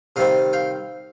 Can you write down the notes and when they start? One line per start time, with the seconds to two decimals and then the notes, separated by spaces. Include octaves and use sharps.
0.16 C3 D#3 G3 C4 D#5 F5
0.53 F5 G5